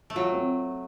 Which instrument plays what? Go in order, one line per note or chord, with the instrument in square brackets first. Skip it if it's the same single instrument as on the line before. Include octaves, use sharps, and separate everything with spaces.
[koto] A3
[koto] F#3 [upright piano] F4
[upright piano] C4